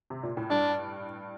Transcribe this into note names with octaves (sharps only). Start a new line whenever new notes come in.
C3
A#2
A2
G2 D4